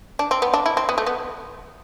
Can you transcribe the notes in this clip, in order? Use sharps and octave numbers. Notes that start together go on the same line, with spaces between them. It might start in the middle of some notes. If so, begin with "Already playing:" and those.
D4
C4
B3
D4
E4
C4
B3
A3
B3